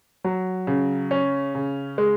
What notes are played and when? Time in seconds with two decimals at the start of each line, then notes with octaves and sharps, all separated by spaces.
0.24 F#3
0.67 C#3
1.11 C#4
1.55 C#3
1.98 G#3